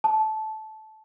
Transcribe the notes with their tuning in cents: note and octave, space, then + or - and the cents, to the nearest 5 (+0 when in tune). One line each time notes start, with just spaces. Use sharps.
A5 -15